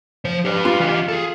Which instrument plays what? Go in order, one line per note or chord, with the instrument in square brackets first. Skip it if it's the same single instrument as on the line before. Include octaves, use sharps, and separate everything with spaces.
[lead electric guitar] F3 C5
G4 B4
[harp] F4
[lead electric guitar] E3 G4
G#4 A4